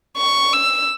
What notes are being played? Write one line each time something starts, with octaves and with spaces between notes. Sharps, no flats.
C#6
E6